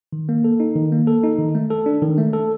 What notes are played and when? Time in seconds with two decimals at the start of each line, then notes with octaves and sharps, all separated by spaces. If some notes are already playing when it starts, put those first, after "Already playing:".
0.13 D#3
0.29 A#3
0.44 A4
0.60 D#4
0.76 D#3
0.92 A#3
1.07 A4
1.23 D#4
1.39 D#3
1.55 A3
1.70 A4
1.86 D4
2.02 D#3
2.18 A3
2.33 A4